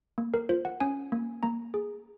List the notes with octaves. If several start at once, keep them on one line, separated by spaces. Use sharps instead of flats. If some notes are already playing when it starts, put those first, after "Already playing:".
A#3
A#4
F4 C5
F#5
C#4 G#5
A#3
A#3 A#5
G#4